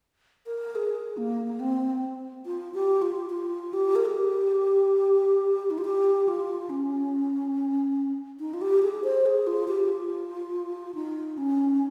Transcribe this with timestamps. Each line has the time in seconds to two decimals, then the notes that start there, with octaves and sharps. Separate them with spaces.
0.46 A#4
0.75 G#4
1.17 A#3
1.60 C4
2.46 F4
2.74 G4
3.02 F4
3.30 F4
3.73 G4
3.95 A#4
4.05 G#4
4.15 G4
5.71 D#4
5.78 F4
5.85 G4
6.28 F4
6.70 C#4
8.40 D#4
8.54 F4
8.61 G4
8.83 G#4
9.04 C5
9.26 G#4
9.47 F4
9.68 G4
9.88 F4
10.95 D#4
11.38 C#4